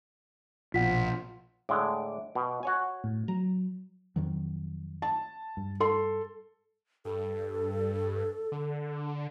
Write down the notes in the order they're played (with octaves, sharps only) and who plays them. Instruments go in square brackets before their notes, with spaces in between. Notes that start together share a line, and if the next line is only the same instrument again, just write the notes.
[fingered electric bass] A#1 [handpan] B2 F4 [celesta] F#5 B6
[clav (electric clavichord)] A2 D3 G#3 [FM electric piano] D6
[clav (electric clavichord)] B2
F#4 C#5 G#5
[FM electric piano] A2
[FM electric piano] F#3 [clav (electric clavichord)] A#5
[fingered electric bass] F2 D#3 F#3
[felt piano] A5
[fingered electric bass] G2
[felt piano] A4 C6
[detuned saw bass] G2 [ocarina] A4
[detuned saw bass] D3